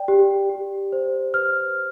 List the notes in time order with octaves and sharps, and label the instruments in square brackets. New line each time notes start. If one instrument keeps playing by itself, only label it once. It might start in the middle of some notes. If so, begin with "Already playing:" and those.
Already playing: [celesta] D5 G5
G4
G4
C5
B4 F6